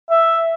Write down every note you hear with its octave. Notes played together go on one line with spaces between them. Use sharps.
E5